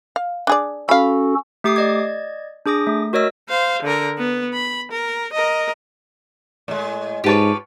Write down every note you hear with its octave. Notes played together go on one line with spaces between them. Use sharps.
F5
D4 G#4 D5
C#4 F#4 A4 F5 B5
A3 G4 D6 D#6 C7
D5 D#5 G#6
D4 G#4 D6 D#6 A#6
A3
F#4 A#4 C#5 D#5 E6
C5 F5
D3 A#4
B3
B5
A#4
A#4 D#5
A2 G#3
G#2 F4 G4 B4 C#5 A5